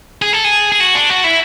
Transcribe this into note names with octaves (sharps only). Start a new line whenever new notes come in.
G#4
A4
G#4
G#4
F#4
D4
F#4
E4